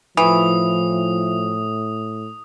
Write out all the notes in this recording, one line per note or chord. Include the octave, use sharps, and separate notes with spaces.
A2 E3 F3 D#6